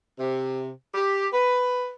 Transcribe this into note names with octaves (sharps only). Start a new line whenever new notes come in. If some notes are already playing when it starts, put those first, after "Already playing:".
C3
G4
B4